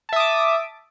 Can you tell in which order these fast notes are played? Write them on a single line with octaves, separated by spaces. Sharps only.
A5 E5 D#6 D6